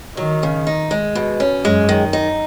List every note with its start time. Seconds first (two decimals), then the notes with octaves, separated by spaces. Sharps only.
0.17 D#3 F#3
0.43 C#3
0.67 D#4
0.91 G#3
1.15 B2
1.40 C#4
1.64 F#2 G#3
1.89 D#3
2.13 D#4